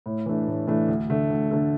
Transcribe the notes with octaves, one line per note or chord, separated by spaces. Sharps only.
A2
E3 A3 D4
A2
E3 A3 D4
D2
D3 A3
D2
D3 A3